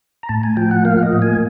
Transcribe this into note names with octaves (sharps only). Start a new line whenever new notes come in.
A#5
A2 A5
G#5
F3 G5
F#5
A#3 F5
D#5
A2
G#5